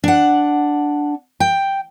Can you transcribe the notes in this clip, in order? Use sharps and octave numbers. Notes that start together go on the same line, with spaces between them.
D4 F#5
G5